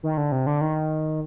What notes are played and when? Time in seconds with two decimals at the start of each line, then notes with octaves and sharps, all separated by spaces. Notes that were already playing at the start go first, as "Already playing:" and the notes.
0.03 D#3
0.17 D3
0.32 C3
0.47 D3
0.61 D#3